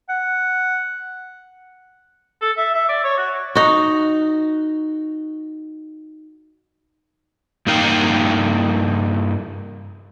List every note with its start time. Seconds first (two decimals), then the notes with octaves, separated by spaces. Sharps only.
0.09 F#5
2.41 A4
2.57 E5
2.74 E5
2.89 D5
3.04 C#5
3.18 F#4
3.55 D#4 F#4
7.67 G2 A#3 D#4 A#4 F5 G5